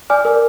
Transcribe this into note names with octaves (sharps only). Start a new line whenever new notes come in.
D5 G#5 D6 F6
A#4